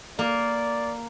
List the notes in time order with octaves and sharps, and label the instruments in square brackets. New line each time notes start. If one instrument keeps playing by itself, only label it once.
[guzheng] A#3 [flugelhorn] D5